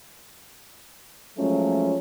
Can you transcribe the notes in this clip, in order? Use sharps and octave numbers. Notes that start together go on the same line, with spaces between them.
F3 F#3 G#3 A3 C#4 F4